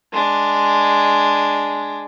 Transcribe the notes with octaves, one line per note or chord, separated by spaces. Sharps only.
G#3 D4